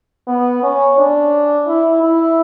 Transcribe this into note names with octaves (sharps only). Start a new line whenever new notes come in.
B3
C#4
D4
E4
E4